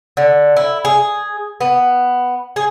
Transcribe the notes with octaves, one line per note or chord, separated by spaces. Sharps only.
D3
E4
G#4
B3
G#4